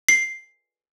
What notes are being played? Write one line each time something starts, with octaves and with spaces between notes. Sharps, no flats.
C7